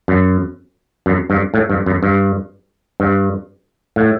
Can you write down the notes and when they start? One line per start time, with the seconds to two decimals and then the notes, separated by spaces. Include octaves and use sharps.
0.08 F#2
1.06 F#2
1.30 G2
1.54 A2
1.70 G2
1.86 F#2
2.03 G2
3.00 G2
3.96 A2